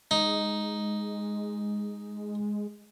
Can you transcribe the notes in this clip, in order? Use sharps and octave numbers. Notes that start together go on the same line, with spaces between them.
G#3 D#4